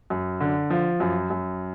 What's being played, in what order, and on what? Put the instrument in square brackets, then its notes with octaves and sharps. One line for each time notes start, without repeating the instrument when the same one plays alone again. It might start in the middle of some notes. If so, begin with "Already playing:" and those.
[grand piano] F#2
D3
F3
F#2
F#2